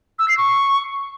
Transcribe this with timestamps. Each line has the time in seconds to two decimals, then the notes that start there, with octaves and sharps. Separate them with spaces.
0.19 E6
0.28 C7
0.38 C#6